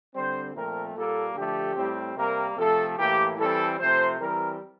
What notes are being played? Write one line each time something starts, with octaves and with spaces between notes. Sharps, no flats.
D3 G3 C4 C5
A#2 F3 A3 C4 A#4
A#2 G3 A#3 A4
D3 F3 A3 G4
A2 G3 C4
C3 G3 A#3 A#4
C3 F3 A3 A4
A2 E3 A#3 G4
E3 G3 C4 A4
C3 F3 A3 C5
E3 G3 C4 A#4